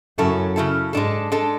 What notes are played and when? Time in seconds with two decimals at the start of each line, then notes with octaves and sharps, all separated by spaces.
0.18 F#2 C#3 F#3 C#4 E4 A4
0.56 C#3 F#3 C#4 E4 A4
0.93 G#2 G#3 D4 A4
1.32 G#3 D4 A4